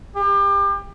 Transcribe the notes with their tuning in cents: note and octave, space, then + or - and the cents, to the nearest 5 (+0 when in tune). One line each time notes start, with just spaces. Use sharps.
G4 +30